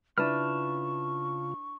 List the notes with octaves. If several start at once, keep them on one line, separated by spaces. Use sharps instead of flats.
C#3 D4 E4 F4 B4 A5 C#6 F6